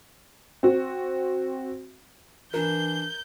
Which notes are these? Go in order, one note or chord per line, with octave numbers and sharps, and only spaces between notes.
C4 F#4
E3 D4 A#4 G6